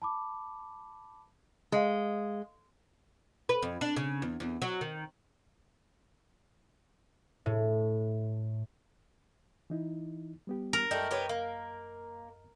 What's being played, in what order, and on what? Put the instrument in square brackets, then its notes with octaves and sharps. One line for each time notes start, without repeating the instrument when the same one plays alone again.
[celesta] A5 B5 D6
[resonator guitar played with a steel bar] G#3 [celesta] D#5 F5
[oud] B4
F2
D4
C#3
E2
E2
F#3
D#3
[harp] A2
[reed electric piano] E3 D#4 E4
G3 B3 G4
[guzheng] A#4
[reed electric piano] F#2 D#5 G6 [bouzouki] G3 A3 G4
[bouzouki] B3 G4 C#5
A#3